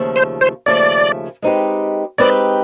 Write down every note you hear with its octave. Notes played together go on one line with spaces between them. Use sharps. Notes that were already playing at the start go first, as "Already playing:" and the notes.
Already playing: D#2 C#3 F3 A3
C5
C5
D#2 C#3 F3 A3 D5
G#3 C4 D#4 G4 B4
G#3 C4 D#4 G4 B4 D5